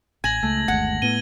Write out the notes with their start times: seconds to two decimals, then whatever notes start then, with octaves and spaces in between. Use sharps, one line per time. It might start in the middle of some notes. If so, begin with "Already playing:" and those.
0.24 A1 G#5 G#6 A#6 F#7
0.43 C#2 A3
0.68 G1 D#2 G#3 F#5 G#6
1.02 A2 B3 D#7 G7